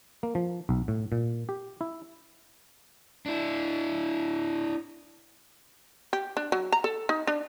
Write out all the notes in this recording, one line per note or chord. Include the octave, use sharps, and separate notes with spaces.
A#3
F3
B1
A2
A#2
G4
E4
D4 E4
G4
D4
F#3
A#5
A4
D#4
D4